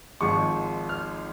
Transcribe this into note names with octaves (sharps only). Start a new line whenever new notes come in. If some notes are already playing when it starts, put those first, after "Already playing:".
G#1 G#2 F3 G#3 C#6
F6